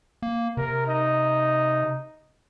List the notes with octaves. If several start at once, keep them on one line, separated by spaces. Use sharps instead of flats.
A#3
C3 A#4
D#4